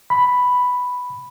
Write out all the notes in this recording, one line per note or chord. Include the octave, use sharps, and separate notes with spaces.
B5